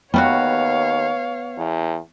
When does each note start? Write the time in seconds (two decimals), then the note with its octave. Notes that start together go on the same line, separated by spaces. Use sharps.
0.14 D#2 G3 A3 B3 F#4 C#5 F5
1.58 E2